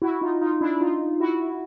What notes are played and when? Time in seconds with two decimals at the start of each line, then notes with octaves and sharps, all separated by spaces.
0.02 E4 F#4
0.21 D#4 F4
0.41 D#4 F4
0.61 D4 E4
0.81 D#4 F4
1.20 E4 F#4